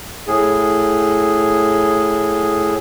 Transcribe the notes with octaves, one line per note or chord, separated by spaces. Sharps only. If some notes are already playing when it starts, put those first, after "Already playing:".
A2 G#4